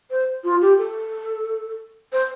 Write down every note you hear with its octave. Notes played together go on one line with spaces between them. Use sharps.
C5
F4
G4
A4
C5